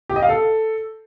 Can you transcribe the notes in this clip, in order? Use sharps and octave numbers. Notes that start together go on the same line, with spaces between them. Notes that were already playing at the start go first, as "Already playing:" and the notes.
G4
D#5
F5
A4